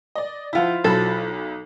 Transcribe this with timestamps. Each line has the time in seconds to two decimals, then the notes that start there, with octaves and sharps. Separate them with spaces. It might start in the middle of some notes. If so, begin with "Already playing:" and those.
0.15 D5 D#5
0.53 F3 E4 F4 C5 F#5 B6
0.84 B1 F#3 A4 B5